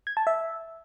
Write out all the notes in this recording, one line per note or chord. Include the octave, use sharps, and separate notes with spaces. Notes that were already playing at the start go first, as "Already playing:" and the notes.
G#6
A5
E5